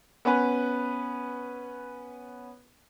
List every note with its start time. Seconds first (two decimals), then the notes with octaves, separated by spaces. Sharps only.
0.25 B3 C#4 B4